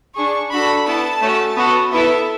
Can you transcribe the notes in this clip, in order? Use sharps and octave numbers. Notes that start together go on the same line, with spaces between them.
D4 G#4 C#6
D4 F#4 A4 B5
B3 E4 A4 A5
A3 C#4 F#4
B3 F#4 A4
B3 E4 A4 E5